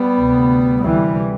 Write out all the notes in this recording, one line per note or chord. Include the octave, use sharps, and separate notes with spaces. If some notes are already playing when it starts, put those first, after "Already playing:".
Already playing: G3 B3
D2 C3
D2 C3 E3 G3